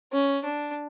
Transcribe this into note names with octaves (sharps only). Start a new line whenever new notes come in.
C#4
D4